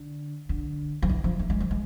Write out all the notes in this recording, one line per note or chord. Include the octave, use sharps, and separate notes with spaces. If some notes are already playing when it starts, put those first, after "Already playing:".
Already playing: D3
D3
F3
E3
F3
A3
G#3
F3
G#3